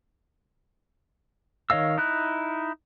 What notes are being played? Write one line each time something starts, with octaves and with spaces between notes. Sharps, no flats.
D#3 C#5 D#5 F5 E6
D#4 E4 F#6